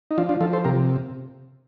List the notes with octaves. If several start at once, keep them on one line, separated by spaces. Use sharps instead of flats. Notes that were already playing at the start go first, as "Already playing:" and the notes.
D#4
F3 D4 F4
D4 F4
F3 F4 A4
A4 C5
C3 G4 A#4